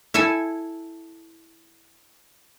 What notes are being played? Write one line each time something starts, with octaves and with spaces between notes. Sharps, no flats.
E4 A4 E5 G#5